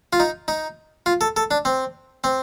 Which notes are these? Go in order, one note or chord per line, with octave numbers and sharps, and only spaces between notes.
F4
D#4
D#4
F4
A4
A4
D4
C4
C4